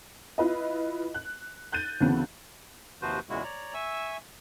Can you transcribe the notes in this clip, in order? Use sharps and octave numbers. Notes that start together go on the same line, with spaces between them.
E4 F4 B4 D#5
F#6
F#6 G6 A6 D#7
D2 C#3 E3 B3 C4
D#2 C3 F3 F#4 B4 C5
E2 A#2 C#3 G#3 E4 F#4
C#5 D5 A#5
E5 G#5 C#6 E6